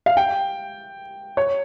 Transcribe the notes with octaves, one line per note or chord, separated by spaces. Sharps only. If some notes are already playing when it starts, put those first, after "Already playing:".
F5
G5
C#5